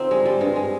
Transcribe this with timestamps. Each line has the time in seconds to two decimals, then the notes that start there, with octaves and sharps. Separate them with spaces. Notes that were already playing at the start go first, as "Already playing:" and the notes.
Already playing: D3 C4 D#4 F4
0.11 G3 G#3
0.26 G3
0.41 G2 G#3
0.56 G#3